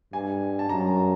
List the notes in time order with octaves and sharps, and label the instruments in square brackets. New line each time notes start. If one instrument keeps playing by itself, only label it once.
[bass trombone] G2 [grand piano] G#5
[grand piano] A5
[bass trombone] F#2 [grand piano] A#5